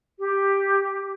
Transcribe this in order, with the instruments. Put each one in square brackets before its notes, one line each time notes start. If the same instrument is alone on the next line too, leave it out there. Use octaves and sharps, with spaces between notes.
[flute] G4